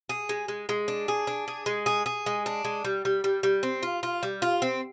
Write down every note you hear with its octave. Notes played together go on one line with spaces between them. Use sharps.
G#4
G#3
G#3
G#3
D4
G#4
D4
G#4
G#3
G#4
G#4
G#3
D4
G#3
G3
G3
G3
G3
C4
F4
F4
G3
F4
C4